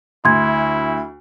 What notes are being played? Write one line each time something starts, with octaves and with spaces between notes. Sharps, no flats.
D2 E4 C6 G#6